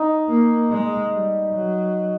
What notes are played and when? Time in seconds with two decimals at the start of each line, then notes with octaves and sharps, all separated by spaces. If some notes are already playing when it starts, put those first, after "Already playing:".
Already playing: D#4
0.29 A#3
0.71 G#3
1.13 G3
1.53 F#3